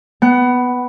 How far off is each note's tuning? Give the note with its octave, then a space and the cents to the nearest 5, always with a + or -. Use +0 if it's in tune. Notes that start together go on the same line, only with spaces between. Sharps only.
B3 +0 F#5 +25